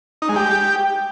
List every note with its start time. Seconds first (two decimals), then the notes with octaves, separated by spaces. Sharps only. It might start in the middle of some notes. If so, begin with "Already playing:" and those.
0.22 D#4
0.29 G#3
0.36 G4